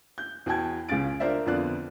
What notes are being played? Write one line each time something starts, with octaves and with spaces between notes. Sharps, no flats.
G6
E2 F#4 F#5 G5 A5 G#6
C#2 C#3 C#4 A6 D7
D4 F4 A#4 C5 D5 E5
F2 D3 B3 F4 D5 F#6